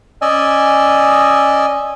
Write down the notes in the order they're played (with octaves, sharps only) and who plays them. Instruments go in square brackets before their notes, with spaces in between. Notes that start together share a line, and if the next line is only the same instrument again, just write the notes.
[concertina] C#4 D5 D#5 G#5 E6